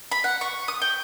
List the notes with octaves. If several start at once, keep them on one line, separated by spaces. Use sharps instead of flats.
B5
F#5
C#6
D#6
G5